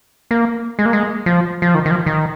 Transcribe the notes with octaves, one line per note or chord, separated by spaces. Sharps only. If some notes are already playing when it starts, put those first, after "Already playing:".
A#3
G#3
A#3
G#3
F3
F3
D#3
D#3
F3
D#3